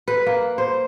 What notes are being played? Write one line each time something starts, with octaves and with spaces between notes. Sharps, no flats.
B4
A#3
C5